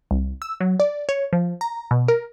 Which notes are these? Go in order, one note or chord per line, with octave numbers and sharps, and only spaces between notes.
C2
E6
F#3
D5
C#5
F3
A#5
B2
A#4